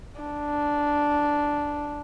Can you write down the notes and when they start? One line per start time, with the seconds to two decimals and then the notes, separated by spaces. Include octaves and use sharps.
0.21 D4